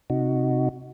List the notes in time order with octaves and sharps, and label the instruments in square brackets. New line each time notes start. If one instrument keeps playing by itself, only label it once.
[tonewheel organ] C3 D#4 F#4